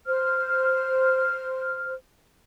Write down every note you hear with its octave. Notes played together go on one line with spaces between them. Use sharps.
C5 F6